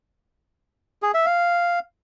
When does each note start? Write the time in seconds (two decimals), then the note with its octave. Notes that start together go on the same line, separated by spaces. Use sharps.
1.02 G#4
1.14 E5
1.26 F5